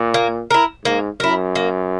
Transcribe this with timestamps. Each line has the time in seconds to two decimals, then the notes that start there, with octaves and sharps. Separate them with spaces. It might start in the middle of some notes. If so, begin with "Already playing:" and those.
Already playing: A#2
0.14 A#3
0.51 E4 A#4
0.85 G#2 A#3
1.20 F#2 E4 A#4
1.55 A#3